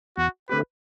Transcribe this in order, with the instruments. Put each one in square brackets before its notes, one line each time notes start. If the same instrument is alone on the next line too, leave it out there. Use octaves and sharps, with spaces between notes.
[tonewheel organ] E2 [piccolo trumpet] F#4
[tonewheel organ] D3 A3 C4 G4 [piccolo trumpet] B4